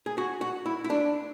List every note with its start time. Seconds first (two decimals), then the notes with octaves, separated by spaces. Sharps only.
0.06 G#4
0.18 F#4
0.41 F#4
0.66 E4
0.84 E4
0.90 D4